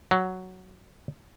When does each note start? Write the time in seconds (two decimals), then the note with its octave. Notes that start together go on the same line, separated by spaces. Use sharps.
0.11 F#3